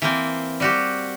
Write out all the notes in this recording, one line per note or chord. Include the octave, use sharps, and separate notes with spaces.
E3 A#3 C4
G3 F#4 G4